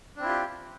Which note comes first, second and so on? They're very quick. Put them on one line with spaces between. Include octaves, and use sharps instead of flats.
D4 C4 E4 F4 G4